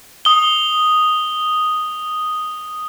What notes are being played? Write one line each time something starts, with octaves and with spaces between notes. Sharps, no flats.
D#6 G7